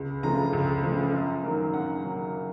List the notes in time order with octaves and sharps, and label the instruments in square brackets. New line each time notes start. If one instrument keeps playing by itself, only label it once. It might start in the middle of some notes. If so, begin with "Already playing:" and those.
Already playing: [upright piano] C#2
C#3 F3 A3 A#5
C#2
C#3 F3 A3
F#2
D#3 F#3 A#3
F#2 F#5
D#3 F#3 A#3